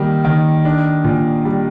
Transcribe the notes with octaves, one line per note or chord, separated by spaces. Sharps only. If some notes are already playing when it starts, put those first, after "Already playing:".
Already playing: D#3 G3 A#3
D#3
D4
A#2
G3